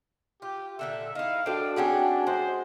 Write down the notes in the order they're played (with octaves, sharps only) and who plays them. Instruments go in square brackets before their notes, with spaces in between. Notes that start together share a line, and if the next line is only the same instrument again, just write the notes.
[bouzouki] F4 [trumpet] G4
[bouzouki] A#2 D3 A4 [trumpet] E5
[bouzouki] D#4 E4 [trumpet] F5
[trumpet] D4 [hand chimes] F#4 A4 D7 [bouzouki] C5 F5 G5
[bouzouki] C4 C#4 G#4 [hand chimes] F#4 F#5 G#5
[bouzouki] G#3 [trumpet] C5